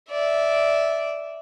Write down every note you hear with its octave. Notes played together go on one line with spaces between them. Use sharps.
D5 E5